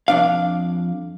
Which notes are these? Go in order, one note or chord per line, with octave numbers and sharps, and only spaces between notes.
F2 D4 F5